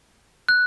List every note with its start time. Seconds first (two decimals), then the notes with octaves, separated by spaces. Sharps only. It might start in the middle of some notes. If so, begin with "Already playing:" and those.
0.49 F#6